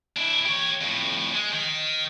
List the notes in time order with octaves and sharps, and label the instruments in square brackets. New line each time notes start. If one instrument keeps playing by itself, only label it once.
[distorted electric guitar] D4 E4
G4 C#5
F2 A2
G#3
D#3